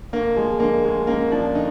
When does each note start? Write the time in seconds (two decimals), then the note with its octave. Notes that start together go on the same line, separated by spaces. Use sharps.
0.13 D2 A#3
0.36 F3 G#3
0.60 D3 A#3
0.84 D2 G#3
1.07 F#2 A#3
1.31 F3 D4
1.55 D3 D#4